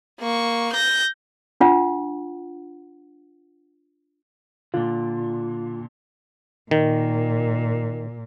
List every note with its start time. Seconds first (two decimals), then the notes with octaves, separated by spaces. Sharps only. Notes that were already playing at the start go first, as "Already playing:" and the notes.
0.20 A#3 C#6
0.73 G6 A#6
1.61 D4 F4 F#5
4.74 A#2 D3 F4
6.71 A#2 D#3